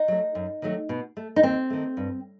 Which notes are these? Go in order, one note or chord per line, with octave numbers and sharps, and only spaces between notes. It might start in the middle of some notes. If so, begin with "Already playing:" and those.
Already playing: D#4
F#3 A3
F#2
D#3 F#3 A3
B2
A3
D#4
D#2 C4
D#3 A3
G2